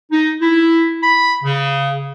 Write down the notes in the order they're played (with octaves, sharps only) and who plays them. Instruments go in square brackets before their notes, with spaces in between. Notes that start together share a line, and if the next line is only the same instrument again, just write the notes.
[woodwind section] D#4
E4
B5
C#3